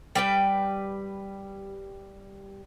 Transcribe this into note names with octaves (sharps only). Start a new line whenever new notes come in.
G3 B4 G5